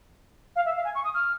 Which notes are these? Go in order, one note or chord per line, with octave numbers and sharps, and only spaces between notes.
F5
E5
F5
G#5
C#6
D#6
F6